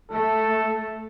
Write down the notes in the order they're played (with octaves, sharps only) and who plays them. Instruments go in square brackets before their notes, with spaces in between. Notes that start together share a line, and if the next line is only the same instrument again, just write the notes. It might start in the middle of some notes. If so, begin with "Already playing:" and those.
[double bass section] A3 [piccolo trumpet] A4